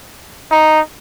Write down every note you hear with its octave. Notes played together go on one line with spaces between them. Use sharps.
D#4